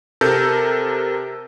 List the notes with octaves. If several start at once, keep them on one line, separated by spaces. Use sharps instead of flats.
C3 A4 A#4 G6